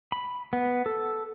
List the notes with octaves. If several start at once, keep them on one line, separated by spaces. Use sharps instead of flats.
B5
B3
A4